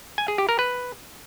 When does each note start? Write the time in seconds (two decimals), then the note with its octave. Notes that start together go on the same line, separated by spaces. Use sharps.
0.18 G#5
0.28 G#4
0.38 G4
0.49 A#4
0.59 B4